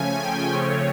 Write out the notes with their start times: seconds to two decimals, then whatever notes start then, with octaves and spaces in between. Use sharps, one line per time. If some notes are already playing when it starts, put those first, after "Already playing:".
Already playing: C#3 F3 A3 C#4 G#5
0.23 G5
0.52 C#3 F3 A3 C4 C#5